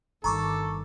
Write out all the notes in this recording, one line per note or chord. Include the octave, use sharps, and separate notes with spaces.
G1 G2 D#3 A4 A#5 C#6 D6